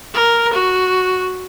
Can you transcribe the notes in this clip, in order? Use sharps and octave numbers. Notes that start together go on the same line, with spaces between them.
A#4
F#4